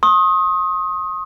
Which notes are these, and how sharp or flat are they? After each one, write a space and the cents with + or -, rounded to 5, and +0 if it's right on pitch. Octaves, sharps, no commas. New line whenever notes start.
C6 +45 D#6 +15